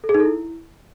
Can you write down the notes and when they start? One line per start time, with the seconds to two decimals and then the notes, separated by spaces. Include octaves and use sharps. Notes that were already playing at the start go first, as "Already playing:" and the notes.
0.04 A4
0.09 G#4
0.14 D#4
0.20 A4
0.25 E4